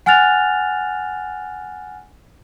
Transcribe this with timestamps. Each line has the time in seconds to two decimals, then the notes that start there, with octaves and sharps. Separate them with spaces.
0.06 F#5 G#5 F6 F#6 A6 F7